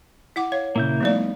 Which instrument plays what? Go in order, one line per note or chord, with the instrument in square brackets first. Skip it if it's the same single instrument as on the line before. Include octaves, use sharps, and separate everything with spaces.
[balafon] E4 F#5 D6
[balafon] C#5 [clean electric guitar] F5
[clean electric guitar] A#2 C#3 [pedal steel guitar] A#3 E4 G6
[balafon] F3 A3 D5 [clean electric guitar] G3 B3 D#4